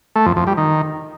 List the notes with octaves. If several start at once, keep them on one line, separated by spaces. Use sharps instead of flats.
A3
F2
F2
G3
D#3